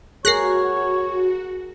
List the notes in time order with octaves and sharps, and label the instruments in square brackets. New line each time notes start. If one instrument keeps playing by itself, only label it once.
[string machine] F#4 [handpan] G#4 A#4 [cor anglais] C#5 [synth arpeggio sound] F#6 A#6 C7